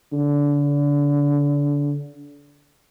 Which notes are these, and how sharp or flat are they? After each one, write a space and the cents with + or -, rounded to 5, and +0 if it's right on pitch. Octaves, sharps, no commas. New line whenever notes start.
D3 -30